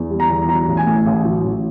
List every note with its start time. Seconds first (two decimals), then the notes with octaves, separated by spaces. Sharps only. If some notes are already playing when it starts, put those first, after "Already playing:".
Already playing: E2
0.10 G3
0.20 A#5
0.29 E2
0.48 F#3 A#5
0.68 A1
0.77 G#5
0.86 A2
1.06 A1
1.25 F#3
1.44 A1